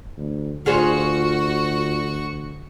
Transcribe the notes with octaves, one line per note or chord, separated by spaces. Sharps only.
D2
D2 F4 F#4 G#4 C5 C#6